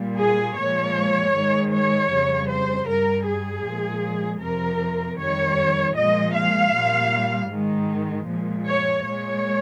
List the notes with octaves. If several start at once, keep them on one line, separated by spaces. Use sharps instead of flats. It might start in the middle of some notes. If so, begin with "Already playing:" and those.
Already playing: A#2 G3
G#4
A#2 F3 G#3 C#5
G#2 D#3 G#3
C#5
F2 C#3 G3
C5
G2 G3 A#4
G#4
A#2 F3 G#3
F2 C3 F3 A#4
F2 D#3 G3 C#5
A#2 F3 G#3 D#5
F5
A#2 G3
G#2 D#3 G#3
A#2 F3 G#3
C#5
A#2 G#3 C#5